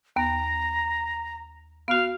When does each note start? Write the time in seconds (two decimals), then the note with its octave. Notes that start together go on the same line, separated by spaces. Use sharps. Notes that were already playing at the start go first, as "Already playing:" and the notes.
0.16 D#2 B3 A#5
1.88 B3 F#4 F5